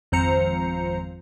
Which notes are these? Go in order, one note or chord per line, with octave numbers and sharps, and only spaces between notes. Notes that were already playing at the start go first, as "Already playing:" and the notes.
G#1 F2 F3 C5 A#5 C#7